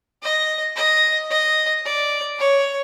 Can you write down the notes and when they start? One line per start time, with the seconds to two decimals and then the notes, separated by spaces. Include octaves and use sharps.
0.22 D#5
0.76 D#5
1.30 D#5
1.85 D5
2.39 C#5